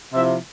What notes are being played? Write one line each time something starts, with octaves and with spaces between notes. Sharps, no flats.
C3 F3 C4 E4 E5